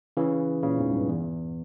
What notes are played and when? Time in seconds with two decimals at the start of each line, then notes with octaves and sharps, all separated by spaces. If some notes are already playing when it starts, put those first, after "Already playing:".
0.17 C#3 E3
0.63 A#2 C#3
0.78 E2 G#2
0.93 G2
1.08 E2